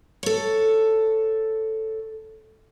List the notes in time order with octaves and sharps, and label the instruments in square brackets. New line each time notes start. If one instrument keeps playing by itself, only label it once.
[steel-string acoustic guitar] A4 C#5